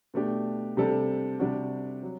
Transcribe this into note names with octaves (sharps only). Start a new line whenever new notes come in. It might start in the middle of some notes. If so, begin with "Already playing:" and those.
B2 A3 D4 G4
C3 G3 D4 A4
C3 G3 D4 F#4
F#3